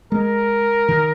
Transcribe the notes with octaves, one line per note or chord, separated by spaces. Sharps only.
G#3 A#4
D#3